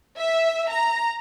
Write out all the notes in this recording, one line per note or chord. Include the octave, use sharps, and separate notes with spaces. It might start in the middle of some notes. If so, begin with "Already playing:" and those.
E5
A#5